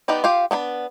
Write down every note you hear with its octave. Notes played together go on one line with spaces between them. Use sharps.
B3 D#4 G4 B4 D5
F4 G4 F5
B3 D4 F#5 B5